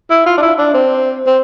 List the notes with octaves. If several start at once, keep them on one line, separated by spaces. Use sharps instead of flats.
E4
F4
D4
E4
D4
C4
C4